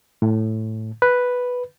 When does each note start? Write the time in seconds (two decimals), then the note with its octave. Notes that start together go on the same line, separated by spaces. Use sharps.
0.22 A2
1.02 B4